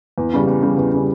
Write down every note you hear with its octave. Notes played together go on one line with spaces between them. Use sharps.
E2
C#3 G3
E2
C#3 G3
E2
C#3 G3